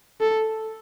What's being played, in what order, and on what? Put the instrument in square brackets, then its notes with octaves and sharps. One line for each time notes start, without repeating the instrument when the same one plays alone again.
[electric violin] A4